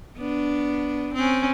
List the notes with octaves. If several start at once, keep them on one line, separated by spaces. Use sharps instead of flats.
B3 D4
C4 C#4